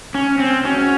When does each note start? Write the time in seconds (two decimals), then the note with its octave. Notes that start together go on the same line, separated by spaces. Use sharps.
0.15 C#4
0.39 C4
0.65 G#3 C#4 D#4 F#4